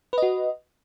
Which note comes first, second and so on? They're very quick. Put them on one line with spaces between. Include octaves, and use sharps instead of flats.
B4 D#5 F#4